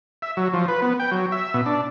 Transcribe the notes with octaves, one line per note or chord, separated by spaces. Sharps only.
E5
F#3
F3
B4
B3
G5
F#3
E5
B2
D4